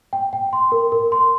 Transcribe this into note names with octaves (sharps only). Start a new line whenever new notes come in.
G5
G5
C6
A#4
A#4
C6